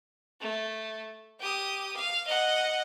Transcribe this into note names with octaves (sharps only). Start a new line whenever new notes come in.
A3
G4 D#6
F5
D#5 F#5